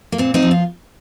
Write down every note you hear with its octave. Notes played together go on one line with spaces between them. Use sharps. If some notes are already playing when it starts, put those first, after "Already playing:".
A#3
A#2 C4
C4 D#4
F3
F4